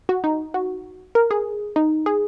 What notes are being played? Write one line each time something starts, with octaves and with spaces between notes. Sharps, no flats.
F#4
D#4
F#4
A#4
G#4
D#4
G#4